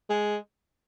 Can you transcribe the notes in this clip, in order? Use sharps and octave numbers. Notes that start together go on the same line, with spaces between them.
G#3